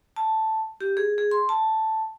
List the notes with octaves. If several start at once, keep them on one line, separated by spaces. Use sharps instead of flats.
A5
G4
G#4
G#4
C6
A5